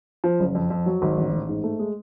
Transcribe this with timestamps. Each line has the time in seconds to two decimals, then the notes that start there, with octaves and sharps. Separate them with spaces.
0.24 F3
0.40 F#1
0.55 F2
0.70 F2
0.86 F#3
1.02 G#1
1.17 A1
1.32 A1
1.49 G#2
1.64 A3
1.79 G#3